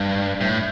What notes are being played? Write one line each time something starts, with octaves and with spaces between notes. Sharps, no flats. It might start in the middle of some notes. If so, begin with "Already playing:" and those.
Already playing: G2
A2